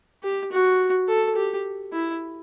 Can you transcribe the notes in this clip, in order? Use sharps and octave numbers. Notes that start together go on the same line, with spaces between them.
G4
F#4
A4
G4
E4